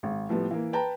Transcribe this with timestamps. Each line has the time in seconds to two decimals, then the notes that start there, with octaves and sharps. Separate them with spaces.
0.03 G#1
0.29 A2 F3 G3 B3
0.51 E3 A#3
0.73 B4 G5 A5 A#5